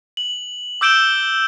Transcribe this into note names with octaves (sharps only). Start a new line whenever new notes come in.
F#7
D6 E6 G6 D7 E7 G7